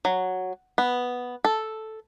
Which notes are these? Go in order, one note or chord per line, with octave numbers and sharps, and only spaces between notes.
F#3
B3
A4